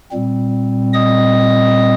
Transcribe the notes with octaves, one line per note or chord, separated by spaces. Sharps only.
A#2 G3 C4
D#5 D#6